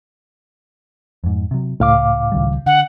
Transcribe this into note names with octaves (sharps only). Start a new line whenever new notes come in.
F2 G#2
C3 F#3
C#2 A2 F5 D6
C#2 D#3 G3
D3 F#5